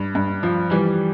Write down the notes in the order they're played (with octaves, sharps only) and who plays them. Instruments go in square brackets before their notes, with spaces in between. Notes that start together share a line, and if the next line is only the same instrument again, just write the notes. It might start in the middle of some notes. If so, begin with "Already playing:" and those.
Already playing: [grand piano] G2
G2
F3
[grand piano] E3 [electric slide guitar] G3